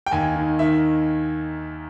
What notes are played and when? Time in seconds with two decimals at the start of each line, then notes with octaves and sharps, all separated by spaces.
0.06 G5
0.11 D#2 G#5
0.36 D#3
0.59 D#3 E5